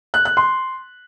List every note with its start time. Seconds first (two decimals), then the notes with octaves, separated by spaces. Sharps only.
0.14 F#6
0.25 F#6
0.37 C6